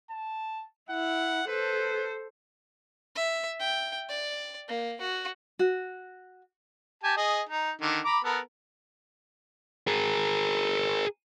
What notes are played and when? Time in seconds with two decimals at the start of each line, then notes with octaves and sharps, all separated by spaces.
0.10 A5
0.90 E4 F#5
1.48 A4 B4 C5
3.16 E5
3.60 G5
4.09 D5
4.68 A#3
5.01 F#4
5.59 F#4
7.04 G4 G#5 A5
7.17 G#4 D#5
7.49 D#4
7.81 D3 D#3
8.05 A#5 B5 D6
8.24 B3 A4 A#4
9.87 G#4 A#4